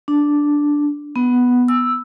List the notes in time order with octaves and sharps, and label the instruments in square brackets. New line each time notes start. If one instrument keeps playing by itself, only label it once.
[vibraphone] D4
B3
E6